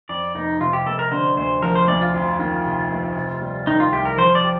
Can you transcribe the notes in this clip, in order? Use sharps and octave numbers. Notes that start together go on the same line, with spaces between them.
F2 D5
F1 D#4
C3 F4
G4
F1 A4
A#4
D3 C5
D2 C5
F3 A#4
C5
D2 D5
F4
F2 F4
D#3 F4
C3
F1
C3
G3
D#3 D#4
F4
C2 G4
A#4
F3 C5
D5
G4